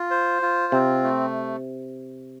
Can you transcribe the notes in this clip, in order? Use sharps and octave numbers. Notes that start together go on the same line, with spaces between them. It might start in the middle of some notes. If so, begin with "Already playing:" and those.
Already playing: F4
C5
F4
C3 C4
A3